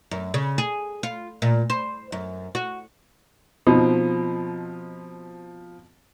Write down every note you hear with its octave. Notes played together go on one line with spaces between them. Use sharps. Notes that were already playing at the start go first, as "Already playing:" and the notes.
F#2
C#3
G#4
F4
A#2
C5
F#2
F#4
B2 F3 C4 D#4